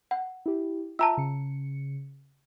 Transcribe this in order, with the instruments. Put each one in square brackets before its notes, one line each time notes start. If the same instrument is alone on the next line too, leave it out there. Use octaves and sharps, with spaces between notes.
[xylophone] F#5
[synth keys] E4 G4
[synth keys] F4 E5 G5 [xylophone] A5 A#5 E6
[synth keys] C#3 C#7